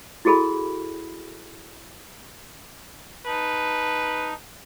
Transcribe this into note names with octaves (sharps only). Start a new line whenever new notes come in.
E4 F#4 G#4 A4 B5
D#4 B4 A5